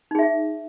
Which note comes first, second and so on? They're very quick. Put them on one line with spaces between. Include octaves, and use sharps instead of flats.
D#4 G#4 E5